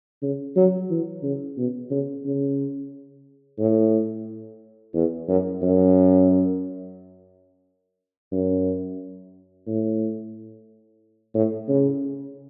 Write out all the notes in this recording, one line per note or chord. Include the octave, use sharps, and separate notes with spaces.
C#3
F#3
E3
C#3
B2
C#3
C#3
A2
E2
F#2
F#2
F#2
A2
A2
C#3